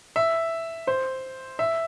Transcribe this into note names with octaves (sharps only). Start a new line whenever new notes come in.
E5
C5
E5